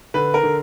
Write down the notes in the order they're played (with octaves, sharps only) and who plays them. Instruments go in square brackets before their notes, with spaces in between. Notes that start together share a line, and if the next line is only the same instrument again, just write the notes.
[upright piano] D3 B4
A#4
D3